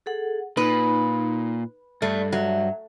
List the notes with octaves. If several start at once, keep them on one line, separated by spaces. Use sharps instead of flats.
G#4 A4 F#5
A#2 D#4 B4
G2 A3 D5
F#3 E5